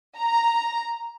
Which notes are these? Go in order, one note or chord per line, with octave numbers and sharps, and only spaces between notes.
A#5